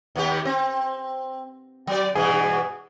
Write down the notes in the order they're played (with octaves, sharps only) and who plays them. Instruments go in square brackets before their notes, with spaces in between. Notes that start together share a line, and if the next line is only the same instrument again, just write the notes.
[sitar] D#2 B3 G4
C4
F#3 D5
[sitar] G2 B2 E3 [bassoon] G#4